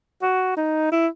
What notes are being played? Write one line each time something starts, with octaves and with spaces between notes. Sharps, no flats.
F#4
D#4
E4